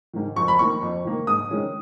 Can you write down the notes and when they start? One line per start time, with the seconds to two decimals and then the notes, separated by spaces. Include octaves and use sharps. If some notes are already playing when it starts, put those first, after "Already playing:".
0.14 G#2 D#3
0.36 F2 C#6
0.48 B5
0.59 D#3 A#3 C#6
0.82 F2
1.05 D#3 A#3
1.27 G#2 D#6
1.49 D#3 G#3 C#4